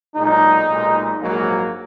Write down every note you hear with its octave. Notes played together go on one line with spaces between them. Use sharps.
B1 A#2 G#3 D#4
B1 A#2 G#3
A#1 G#2 F#3 A#3